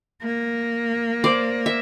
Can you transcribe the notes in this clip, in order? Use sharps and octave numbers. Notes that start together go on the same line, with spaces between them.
A#3
C5 D5
E5